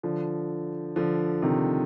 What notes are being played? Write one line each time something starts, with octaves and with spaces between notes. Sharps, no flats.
D3 F3
D3 F3
C3 D#3